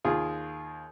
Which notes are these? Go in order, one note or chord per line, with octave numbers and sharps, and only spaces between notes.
D#2 F4 G#4